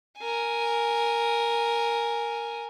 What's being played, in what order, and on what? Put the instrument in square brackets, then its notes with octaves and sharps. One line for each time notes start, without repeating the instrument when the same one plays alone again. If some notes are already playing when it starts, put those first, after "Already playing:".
[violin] A#4 G#5